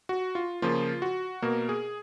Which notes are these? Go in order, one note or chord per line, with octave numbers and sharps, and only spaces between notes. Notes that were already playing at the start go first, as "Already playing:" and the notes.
F#4
F4
C#3 F3 A#3 F4
F#4
B2 A#3 A#4
G#4